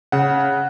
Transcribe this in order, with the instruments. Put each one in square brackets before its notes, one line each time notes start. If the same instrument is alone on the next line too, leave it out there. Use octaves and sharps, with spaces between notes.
[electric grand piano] C#3 F#5